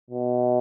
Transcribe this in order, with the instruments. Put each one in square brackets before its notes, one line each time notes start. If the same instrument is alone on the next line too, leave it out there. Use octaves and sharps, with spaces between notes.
[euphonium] B2